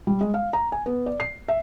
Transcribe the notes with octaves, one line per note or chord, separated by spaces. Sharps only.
G3
G#3
F5
A#5
G#5
B3
D5
C7
E5